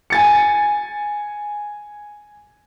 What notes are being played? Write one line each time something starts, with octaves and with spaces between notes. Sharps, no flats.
G#5 A6 C#7